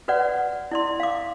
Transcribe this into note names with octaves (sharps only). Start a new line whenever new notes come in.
F#4 B4 C#5 D5 F#5
E4 D5 C6
F5 D6